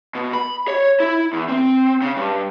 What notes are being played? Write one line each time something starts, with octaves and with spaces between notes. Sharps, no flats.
B2
B5
C#5
E4
E2
C4
C#3
G2